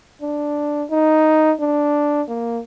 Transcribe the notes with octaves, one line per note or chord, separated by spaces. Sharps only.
D4
D#4
D4
A#3